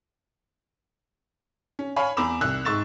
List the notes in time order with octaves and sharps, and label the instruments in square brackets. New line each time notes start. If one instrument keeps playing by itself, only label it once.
[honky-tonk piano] C#4
C#5 F5 G#5 B5
E2 A#5 B5 D6 E6 E7
C2 E6 F#6
G#2 C#6 E6 A6 E7